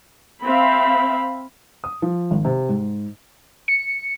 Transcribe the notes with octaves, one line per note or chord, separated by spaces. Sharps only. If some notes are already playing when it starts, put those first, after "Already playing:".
C4 E5 F5 B5
D#6
F3
G#1
C3
G#2
C#7